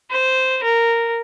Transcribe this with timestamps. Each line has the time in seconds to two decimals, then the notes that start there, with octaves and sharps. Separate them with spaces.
0.10 C5
0.63 A#4